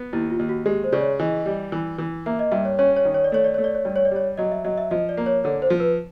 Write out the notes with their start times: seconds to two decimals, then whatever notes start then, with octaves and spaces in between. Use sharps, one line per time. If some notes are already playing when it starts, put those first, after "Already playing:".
Already playing: B3
0.13 D#2 E4
0.30 F4
0.39 D#2
0.49 F#4
0.66 G#3 G4
0.84 C5
0.93 C#3 D5
1.01 C#5
1.20 E3 D#5
1.46 G3
1.72 E3
1.98 E3
2.26 A#3 E5
2.39 D#5
2.51 G2 E5
2.65 C#5
2.79 C#4 C#5
2.97 C#5
3.05 D#3
3.14 C#5
3.24 D5
3.32 A3 C#5
3.44 D5
3.54 A3 C#5
3.64 D5
3.75 C#5
3.85 G2 D5
3.96 C#5
4.05 D5
4.11 G3 C#5
4.37 F#3 D#5
4.52 E5
4.64 F#3 D#5
4.78 E5
4.91 F3 D#5
5.09 D5
5.17 A#3
5.26 C#5
5.44 D3 C#5
5.62 C5
5.70 F3
5.80 B4